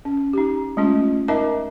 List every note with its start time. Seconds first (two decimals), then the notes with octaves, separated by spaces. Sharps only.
0.05 C#4
0.33 D#4 G4
0.77 G#3 A3 C#4 F4 D#5
1.28 D#4 A#4 D#5 E5 A5 D6